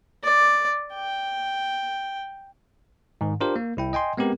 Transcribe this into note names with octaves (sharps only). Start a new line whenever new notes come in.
D5
G5
G#2 D#3
D4 F4 G4 A#4 C5
A#3
C2 E4 G5
D#5 G5 G#5 C6
G#3 B3 C4 G4 A#4